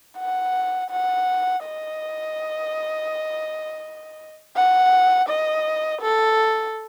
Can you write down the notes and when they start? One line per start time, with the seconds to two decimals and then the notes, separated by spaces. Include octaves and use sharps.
0.18 F#5
0.90 F#5
1.64 D#5
4.56 F#5
5.29 D#5
6.02 A4